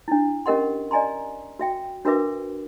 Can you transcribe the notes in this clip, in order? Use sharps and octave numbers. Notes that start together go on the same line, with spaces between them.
D4 E4
C#4 G4 A#4 D#5 F#5 C6
D5 D#5 G#5 A#5 C6
F#4 E5 G5
D4 F#4 A#4 B4 E5 D6